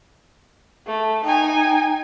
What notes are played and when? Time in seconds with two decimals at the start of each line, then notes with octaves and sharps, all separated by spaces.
0.87 A3
1.24 D#4 G5 G#5